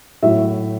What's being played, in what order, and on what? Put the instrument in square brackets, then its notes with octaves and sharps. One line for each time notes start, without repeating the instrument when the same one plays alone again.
[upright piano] A2 F#3 E5